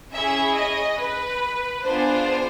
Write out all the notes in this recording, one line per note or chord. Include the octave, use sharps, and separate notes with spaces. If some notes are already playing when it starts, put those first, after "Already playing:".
C#4 E4 G#4 E5
D#5
B4
B3 D4 F4 G#4 C5